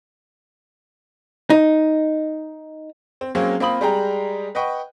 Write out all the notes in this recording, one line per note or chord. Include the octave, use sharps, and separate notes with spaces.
D#4
C4
F#3 G#3 A#3 C4 C#4
A#3 C4 F4 B5 D#6 F#7
G3 G#3 G#4 G5 A#5
B4 D#5 F#5 G5 C#6